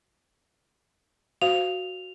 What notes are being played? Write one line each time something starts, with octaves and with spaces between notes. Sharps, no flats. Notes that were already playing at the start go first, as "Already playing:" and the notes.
F#4 C5 F5 F7